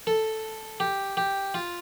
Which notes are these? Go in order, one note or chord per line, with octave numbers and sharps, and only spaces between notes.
A4
G4
G4
F4